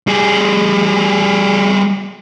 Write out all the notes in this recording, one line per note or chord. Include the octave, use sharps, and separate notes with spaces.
G3 G#4